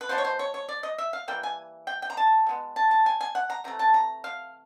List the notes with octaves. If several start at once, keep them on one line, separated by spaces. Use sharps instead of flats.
B4
F3 G#3 B3 D4 C5
C#5
C5
C#5
C#5
D5
D#5
E5
F5
E3 G3 A#3 G5
G#5
G5
G5
A#5
A5
B2 G#3 B3
A5
A5
G#5
G#5
F#5
A#5
C3 E3 A3 A#5
A5
A#5
F5